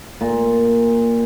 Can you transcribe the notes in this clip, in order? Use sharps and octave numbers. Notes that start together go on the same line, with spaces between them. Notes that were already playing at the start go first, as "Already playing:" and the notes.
A#2